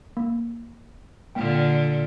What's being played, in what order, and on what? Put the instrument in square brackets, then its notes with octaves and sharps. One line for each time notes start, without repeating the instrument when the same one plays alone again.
[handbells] A#3
[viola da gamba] A#2 D3 [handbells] A#3 G5